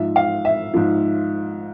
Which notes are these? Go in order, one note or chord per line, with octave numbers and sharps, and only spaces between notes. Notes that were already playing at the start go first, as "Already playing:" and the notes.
Already playing: G#2 F3 E5
F5
E5
G#2 F3